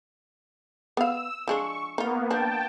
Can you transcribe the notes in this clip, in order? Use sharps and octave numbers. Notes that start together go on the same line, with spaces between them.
B3 F5 E6
F3 G#3 D4 C#6
A#3 B3 D#4 F4
F3 D4 G5 A5